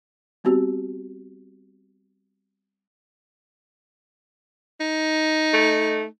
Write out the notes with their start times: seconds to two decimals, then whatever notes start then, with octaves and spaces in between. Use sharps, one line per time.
0.44 G3 B3 C4 F#4 G4
4.81 D#4
5.54 A3